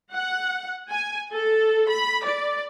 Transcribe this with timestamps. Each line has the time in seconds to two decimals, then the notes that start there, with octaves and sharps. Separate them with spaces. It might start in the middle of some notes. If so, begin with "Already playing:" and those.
0.14 F#5
0.90 G#5
1.33 A4
1.89 B5
2.24 D5